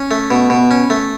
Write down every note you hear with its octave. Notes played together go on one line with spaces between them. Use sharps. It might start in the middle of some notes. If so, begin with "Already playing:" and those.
Already playing: C#4
A3
B2
B2
C#4
A3